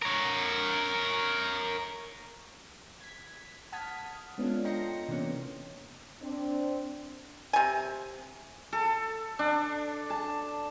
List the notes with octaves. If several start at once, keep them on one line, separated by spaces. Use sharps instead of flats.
A#4 C#5
G#6 B6
F#5 A5 D#6 F6 G#6 B6
G#3 B3 C#4 D4 F4 A4
D#5 G5 A#5 C6 A#6 C#7
C3 E3 A#3 B3 C#4
C4 D4
C3 G#5
A4
D4
A5